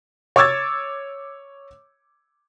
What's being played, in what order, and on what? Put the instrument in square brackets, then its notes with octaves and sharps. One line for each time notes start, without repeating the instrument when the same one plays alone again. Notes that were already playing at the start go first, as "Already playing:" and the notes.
[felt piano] C#5 C#6 D6 E6 G#6 A6